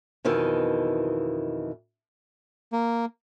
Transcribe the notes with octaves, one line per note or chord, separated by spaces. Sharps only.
F2 B2 D#3 E3
A#3